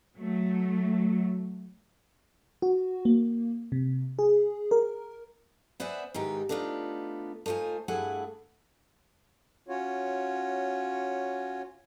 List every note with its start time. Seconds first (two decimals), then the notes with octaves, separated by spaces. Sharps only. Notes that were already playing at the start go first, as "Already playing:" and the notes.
0.17 F#3 A3
2.62 F#4
3.05 A#3
3.72 C3
4.19 G#4
4.71 A#4
5.80 B3 C5 D5 E5 F#5 G#5
6.14 G#2 D#3 E3 D#4 G4
6.49 A3 B3 D4 D#4 F4
7.46 A3 D#4 F4 C5 G#5
7.88 G2 A3 E4 G#4 F#5 G#5
9.68 C#4 F4 F#4 C#5